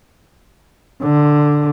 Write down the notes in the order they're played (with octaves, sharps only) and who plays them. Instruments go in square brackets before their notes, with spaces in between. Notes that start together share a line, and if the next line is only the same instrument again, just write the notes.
[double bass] D3